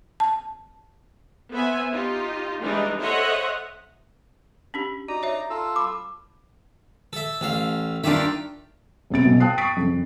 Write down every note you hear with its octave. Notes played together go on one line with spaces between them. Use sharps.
A5
B3 C5 E5 G#5
D#4 F4 G4
E3 G3 G#3 D4 D#4
A4 C5 C#5 D#5 E5 F#5
C#4 D4 G4
D#4 F#4 D5 A#5
C#5 E5
F4 A4 E6
B5 D6
A4 E5
A1 A4 F5
D#3 D4 F4 G4 E5
E1 F#2 C3 A6 D7
B1 B2
G5 A5 D#6 F#6 C7
C#6 D#6 A6 B6 C7 D7
F2 C#3